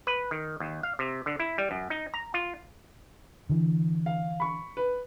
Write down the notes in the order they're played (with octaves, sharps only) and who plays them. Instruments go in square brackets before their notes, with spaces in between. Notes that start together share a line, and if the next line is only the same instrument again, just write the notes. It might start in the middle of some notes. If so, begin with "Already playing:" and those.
[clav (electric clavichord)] B4
D#3
D#2
F5
C3
D3
E4
G3
F#2
D#4
A#5
F4
[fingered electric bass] D3 E3
[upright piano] F5
B5 C#6
B4